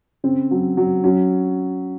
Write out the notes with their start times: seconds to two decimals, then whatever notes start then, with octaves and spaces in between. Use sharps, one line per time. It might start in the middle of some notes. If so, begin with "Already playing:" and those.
0.24 C#3 C4
0.51 F#3
0.77 F#3
1.04 F#3 C#4